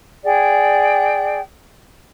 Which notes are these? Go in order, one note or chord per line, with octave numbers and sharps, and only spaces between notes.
G#4 D5 G5